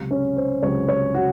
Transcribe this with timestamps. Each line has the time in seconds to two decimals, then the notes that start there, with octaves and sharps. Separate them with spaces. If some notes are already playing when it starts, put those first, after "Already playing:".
Already playing: C#2 C3 F#3
0.11 C#4
0.37 C5
0.62 C#2 C3 F#3 C#5
0.89 C#5
1.15 F#4